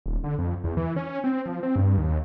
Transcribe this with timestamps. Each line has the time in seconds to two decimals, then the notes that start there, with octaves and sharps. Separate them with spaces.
0.06 D#1
0.24 D3
0.38 F2
0.64 E2
0.77 E3
0.96 C#4
1.24 C4
1.46 F3
1.63 C4
1.76 G2
1.97 D#2